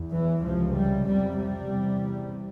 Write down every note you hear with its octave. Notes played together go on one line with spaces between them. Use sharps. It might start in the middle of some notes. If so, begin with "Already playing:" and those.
Already playing: E2
E3
C#2 C3 F3
G3
F2 C3 G3
G3
E2 C3